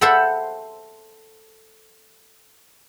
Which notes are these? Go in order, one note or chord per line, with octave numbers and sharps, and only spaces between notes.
A4 C5 E5 F#5 G5 B5